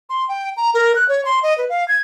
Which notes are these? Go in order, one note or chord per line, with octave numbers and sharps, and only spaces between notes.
C6
G5
A#5
A#4
F#6
C#5
C6
D#5
B4
F5
G#6